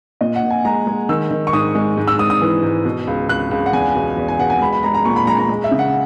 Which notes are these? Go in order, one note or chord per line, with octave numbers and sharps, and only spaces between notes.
A#2 D#5
F#5
A#2
G#5
G#3 A#5
G#3
D#3 E6
D#3
C#6
G#2 D#6
G#3
G#2
E6
G#2 D#6
D#6
E3
G#2
B2
C#2
C#2 F#6
C#2
F#5
E2 G#5
B2
E2
G#5
B2 F#5
G#5
G#3 B5
B5
G#3 A#5
A#5
A#2 C#6
B5
G#3 A#5
A#5
G#3
E5
C#3
F#5